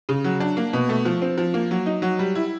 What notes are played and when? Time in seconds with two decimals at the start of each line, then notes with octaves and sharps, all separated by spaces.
0.09 C#3
0.24 F#3
0.40 D4
0.57 A#3
0.73 B2
0.89 A3
1.05 F3
1.22 C4
1.38 F3
1.54 A#3
1.71 F#3
1.86 D#4
2.02 F#3
2.19 G3
2.35 E4